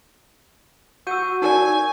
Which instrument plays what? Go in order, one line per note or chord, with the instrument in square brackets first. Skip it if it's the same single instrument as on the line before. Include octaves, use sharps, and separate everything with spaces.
[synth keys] F#4 [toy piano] F#5 E6 [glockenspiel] C#6 G6 D#7
[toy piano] D#4 A#4 D5 [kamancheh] G#5